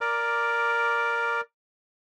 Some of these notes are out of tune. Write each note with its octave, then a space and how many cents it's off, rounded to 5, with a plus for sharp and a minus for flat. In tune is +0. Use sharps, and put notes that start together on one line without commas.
A#4 +0 D5 +0 D6 +0